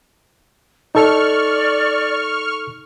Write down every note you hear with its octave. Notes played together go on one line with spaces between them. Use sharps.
D#4 A4 D5 C#6 F6